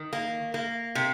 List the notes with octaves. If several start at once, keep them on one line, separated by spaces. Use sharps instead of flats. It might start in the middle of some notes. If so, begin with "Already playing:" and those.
Already playing: D#3
A#3
A#3
C3